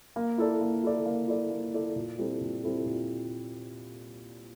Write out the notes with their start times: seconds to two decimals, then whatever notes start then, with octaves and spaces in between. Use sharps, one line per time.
0.16 A#3
0.38 E4 A4 D5
0.61 A#3
0.83 E4 A4 D5
1.06 A#3
1.28 E4 A4 D5
1.50 A#3
1.73 E4 A4 D5
1.96 A#2
2.18 G3 C4 E4 A4
2.41 A#2
2.63 G3 C4 E4 A4
2.86 A#2